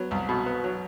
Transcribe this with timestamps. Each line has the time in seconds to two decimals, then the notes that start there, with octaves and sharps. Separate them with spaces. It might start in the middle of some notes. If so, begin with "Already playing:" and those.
Already playing: F#3 B3
0.11 C2
0.29 B2
0.46 B3
0.64 F#3